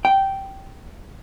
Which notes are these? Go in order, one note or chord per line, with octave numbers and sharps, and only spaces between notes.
G5